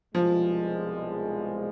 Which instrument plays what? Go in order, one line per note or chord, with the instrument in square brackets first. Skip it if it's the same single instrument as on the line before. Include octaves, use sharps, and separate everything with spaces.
[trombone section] C2 B2 G#3 [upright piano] F3